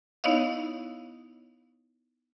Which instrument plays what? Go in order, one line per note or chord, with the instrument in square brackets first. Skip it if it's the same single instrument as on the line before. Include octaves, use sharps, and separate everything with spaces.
[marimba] B3 D#4 E4 C#5 D#5 F5